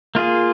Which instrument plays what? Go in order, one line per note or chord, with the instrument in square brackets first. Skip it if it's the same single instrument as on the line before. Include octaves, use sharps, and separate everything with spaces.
[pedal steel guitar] A#3 F4 G#4